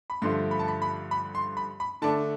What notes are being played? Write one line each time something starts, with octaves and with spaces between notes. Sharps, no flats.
B5
G2 D3 F3 A3 C6
B5
A5
B5
B5
B5
C6
B5
B5
D3 A3 D4 A5